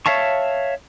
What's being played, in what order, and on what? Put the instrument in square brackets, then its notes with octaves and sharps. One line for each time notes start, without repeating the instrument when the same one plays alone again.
[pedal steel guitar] C#5 E5 F5 A5 C#6